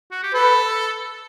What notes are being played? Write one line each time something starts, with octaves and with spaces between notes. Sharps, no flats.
F#4
G4
A4 B4